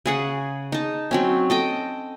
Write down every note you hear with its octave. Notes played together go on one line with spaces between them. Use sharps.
C#3 G#4 F#5
D#4 A5
F#3 C4 C#4
A4 D#5 G5